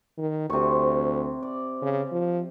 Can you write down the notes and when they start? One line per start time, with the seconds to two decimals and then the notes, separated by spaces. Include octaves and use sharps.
0.18 D#3
0.50 D2 C3 C#6
1.43 D5
1.82 C#3
2.12 F3